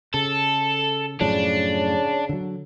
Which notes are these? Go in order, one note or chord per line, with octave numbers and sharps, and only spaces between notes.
C#3 A4
F#2 A2 C#3 F3 D4
D3 F#3